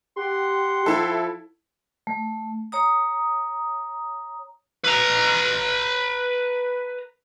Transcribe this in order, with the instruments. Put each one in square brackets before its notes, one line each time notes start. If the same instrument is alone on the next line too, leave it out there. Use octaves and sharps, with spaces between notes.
[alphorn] G4 [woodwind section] F#5 G5 C6
[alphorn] F3 [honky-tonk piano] E4 A4
[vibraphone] A3
C#5 A#5 D#6
[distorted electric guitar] B4 A#5